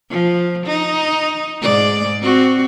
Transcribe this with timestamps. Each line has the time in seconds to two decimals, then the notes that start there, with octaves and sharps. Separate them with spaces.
0.10 F3
0.67 D#4
1.62 G#2 G#3 D5
2.22 C4 F#4